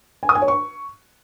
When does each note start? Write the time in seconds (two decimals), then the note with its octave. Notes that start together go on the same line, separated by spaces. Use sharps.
0.23 G#5
0.29 D#6
0.35 G#5
0.42 C#5
0.48 C#6